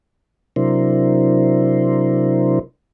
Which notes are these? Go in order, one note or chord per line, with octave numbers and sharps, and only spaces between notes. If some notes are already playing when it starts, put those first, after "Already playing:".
C3 F#3 D4 E4 A#4 C5